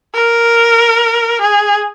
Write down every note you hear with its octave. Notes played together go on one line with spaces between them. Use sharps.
A#4
G#4